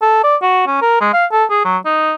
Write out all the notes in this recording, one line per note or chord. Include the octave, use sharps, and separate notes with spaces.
A4
D5
F#4
C#4
A#4
G#3
F5
A4
G#4
F#3
D#4